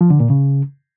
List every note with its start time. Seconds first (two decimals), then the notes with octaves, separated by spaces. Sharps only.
0.01 F3
0.10 D3
0.20 A#2
0.30 C#3